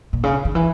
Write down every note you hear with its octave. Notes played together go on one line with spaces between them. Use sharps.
A#2
C#3
D#3
E3